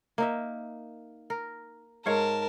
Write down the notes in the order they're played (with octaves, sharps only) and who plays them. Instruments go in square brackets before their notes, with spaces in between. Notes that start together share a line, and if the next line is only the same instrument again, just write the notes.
[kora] A#3 D#4 E5
A#4
[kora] G#2 C#5 F5 [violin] A#4 A5